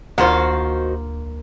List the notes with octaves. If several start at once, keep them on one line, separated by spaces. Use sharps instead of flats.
D2 D#3 A#3 F4 F#4 C5 F5